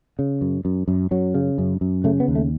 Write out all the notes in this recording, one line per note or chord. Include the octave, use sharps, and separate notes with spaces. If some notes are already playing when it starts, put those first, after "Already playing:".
C#3
F#2
F#2
F#2
F#2 F#3
C#3
F#2
F#2
C#3 A3
B3
D#2
A3